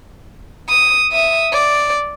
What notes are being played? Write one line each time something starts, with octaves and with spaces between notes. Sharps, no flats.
D#6
E5 D#6
D5